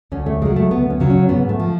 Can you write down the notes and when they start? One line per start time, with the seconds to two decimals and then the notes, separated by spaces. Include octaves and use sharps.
0.12 D2 C#4
0.26 A3
0.42 C#3 F#3 G#3
0.56 A3
0.71 D2 B3
0.90 C#4
1.00 C#3 F#3
1.10 C#4
1.29 G#2 B3
1.49 A3
1.60 F3